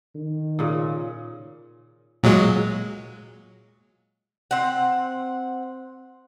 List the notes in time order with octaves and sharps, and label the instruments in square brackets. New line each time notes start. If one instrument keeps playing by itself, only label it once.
[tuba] D#3
[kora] A#2 C#3
[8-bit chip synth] A#2 F#3 G#3
[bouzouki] C4 F#5